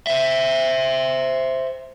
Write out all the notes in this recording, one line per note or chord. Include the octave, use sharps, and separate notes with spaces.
C5 E5